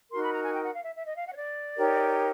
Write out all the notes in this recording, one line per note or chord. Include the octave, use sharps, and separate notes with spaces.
D#4 F#4 A#4 C6
B5
A#5
G#5
G5
F#5
F5
E5
E5
D#5
F5
F#5
C#5
D5
D#4 G4 A#4 C#5